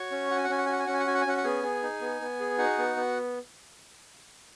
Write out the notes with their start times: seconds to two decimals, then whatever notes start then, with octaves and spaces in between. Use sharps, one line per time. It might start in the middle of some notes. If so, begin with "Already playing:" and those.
Already playing: F#4 C#5 C#6
0.12 C#4
0.31 F#4 F#5
0.37 G#5
0.44 F#5
0.49 C#4 G#5
0.58 F#5
0.66 G#5
0.68 F#4 F#5
0.79 G#5
0.87 C#4 F#5
0.94 G#5
1.00 F#5
1.07 F#4 G#5
1.14 F#5
1.21 G#5
1.26 C#4 F#4 F#5
1.37 F#5
1.44 B3 G#4 G#5
1.63 G#4
1.83 D#4
2.01 B3
2.21 B3
2.40 G#4
2.58 D#4 F#4 F#5
2.78 B3
2.96 B3